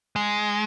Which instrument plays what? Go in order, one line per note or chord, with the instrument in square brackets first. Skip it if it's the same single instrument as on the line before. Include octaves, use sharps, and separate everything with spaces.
[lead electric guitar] G#3